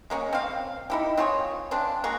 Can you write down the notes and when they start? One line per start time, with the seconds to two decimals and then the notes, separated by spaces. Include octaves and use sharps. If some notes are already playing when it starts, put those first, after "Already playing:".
0.10 G#3 A#3 C#4
0.33 C4 F5
0.90 D#4 E4 G4
1.17 C4 F4 G#4 C#5
1.71 C#3 C4 D4
2.04 G#3 A#3 F#4